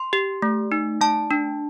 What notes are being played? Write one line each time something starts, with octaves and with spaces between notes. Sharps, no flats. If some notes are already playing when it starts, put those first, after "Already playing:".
Already playing: C6
G4
A3
D#4
A3 A5
D4